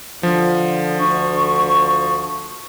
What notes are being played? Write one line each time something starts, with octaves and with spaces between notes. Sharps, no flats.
D3 F3
D2 C#6